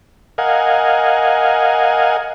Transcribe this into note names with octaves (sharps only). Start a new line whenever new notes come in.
A#4 D#5 F5 F#5 G#5